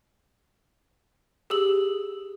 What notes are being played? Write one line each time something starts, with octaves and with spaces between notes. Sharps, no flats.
G4 G#4 E6 F#7